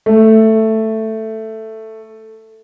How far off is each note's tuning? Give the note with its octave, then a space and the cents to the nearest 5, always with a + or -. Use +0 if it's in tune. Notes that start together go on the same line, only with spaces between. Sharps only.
A3 +5